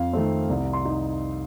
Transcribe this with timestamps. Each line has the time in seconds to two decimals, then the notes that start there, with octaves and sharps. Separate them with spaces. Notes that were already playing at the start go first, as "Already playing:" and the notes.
Already playing: F2 F5
0.13 D#3 A3 C4
0.49 C2
0.73 C6
0.85 D#4